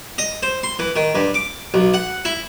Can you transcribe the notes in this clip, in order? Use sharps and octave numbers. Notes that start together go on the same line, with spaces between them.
D#5
C5
C6
E3
D#3
G2
D6
B1
F#5
E4